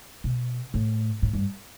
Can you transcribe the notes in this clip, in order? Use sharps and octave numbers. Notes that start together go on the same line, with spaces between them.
B2
A2
A2
G2